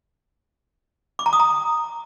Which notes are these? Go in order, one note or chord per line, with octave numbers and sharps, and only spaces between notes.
D6
A#5
D#6
A#5